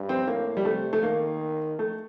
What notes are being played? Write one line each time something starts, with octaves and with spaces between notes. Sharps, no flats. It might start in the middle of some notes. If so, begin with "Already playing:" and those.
Already playing: G2
C4
A2 A#3
G3
C3 A3
A3
D#3 A#3
A3